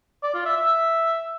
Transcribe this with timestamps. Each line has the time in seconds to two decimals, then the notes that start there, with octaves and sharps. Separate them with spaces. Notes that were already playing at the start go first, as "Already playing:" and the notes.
0.23 D5
0.34 F4
0.45 E5
0.56 E5